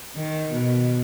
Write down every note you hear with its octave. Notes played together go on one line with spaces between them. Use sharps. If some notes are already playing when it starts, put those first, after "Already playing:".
D#3
B2